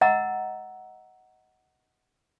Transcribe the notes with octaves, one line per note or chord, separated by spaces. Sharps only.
D#5 F#5 A#5 E6